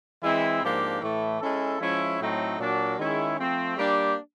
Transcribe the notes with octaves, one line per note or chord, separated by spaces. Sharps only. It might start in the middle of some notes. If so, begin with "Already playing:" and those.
E3 G#3 C4 E4
G#2 F3 A#3 D4 G4
A2 E3 A3
G#3 C#4 E4 A4
F3 G#3 C#4 E4
A2 F#3 A3 C4 D#4
A#2 F#3 A#3 D4 F#4
D#3 G#3 C#4 E4 G#4
F3 A3 C4
G3 A#3 D4 G4